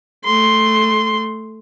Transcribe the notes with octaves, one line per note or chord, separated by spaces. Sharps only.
A3 C6